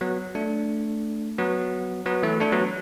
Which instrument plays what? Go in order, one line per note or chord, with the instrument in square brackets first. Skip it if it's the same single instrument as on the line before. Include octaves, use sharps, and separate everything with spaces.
[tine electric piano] F#3 B3
A3 D4
F#3 B3
F#3 B3
E3 A3
A3 D4
F#3 B3